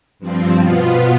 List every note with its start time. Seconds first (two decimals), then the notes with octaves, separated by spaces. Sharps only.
0.19 G2 F3 C4
0.56 B2 B3 F4